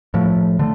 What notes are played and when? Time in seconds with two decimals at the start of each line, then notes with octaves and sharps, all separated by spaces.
0.14 A2 F3 A3
0.59 D3 A3